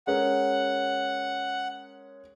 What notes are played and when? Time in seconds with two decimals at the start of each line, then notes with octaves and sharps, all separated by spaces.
0.07 G#3 C#4 A#4 F#5